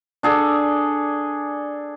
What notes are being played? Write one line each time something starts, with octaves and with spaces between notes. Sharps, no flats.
D4 G#4 A4 D5